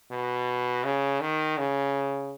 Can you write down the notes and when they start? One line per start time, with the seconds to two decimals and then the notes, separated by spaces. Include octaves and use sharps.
0.11 B2
0.84 C#3
1.21 D#3
1.58 C#3